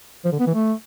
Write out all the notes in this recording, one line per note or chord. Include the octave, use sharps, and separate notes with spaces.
F3
D3
B3
E3
A3